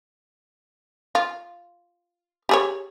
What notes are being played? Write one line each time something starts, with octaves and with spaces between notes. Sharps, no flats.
F4
G4 G#4 C#5